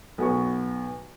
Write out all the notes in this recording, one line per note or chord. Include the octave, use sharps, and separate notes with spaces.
B1 B3 C#6